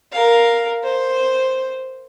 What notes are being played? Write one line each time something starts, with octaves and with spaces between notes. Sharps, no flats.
A#4 F5
C5